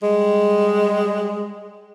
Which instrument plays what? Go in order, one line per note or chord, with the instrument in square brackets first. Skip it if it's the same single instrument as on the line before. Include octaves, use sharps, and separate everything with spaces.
[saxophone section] G3 G#3